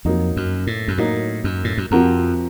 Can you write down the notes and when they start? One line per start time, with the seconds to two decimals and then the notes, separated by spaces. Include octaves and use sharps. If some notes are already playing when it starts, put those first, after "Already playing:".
0.05 F2 F#3 A#3 D#4
0.37 F#2
0.67 A2
0.88 F#2
0.98 A2 F#3 A#3 D#4
1.44 F#2
1.64 A2
1.78 F#2
1.91 F2 C3 F3 C4 F#4 A#4